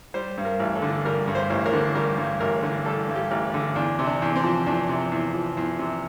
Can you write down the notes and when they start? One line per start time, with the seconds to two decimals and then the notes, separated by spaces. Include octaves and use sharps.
0.14 G3 C5
0.38 G2
0.45 A#4
0.59 A1
0.75 A4
0.82 D3
1.05 G3 A#4
1.28 G2
1.35 C5
1.50 A1
1.66 A#4
1.73 D3
1.95 G3 A#4
2.18 G2
2.40 A1 A#4
2.63 D3
2.86 G3 A4
3.08 G2
3.16 G4
3.31 A1
3.54 D3
3.75 E2 D4
3.99 C3
4.06 D4
4.22 E2
4.36 C4
4.43 F3
4.66 E2 D4
4.89 C3
5.12 E2
5.34 F3
5.57 E2
5.79 C3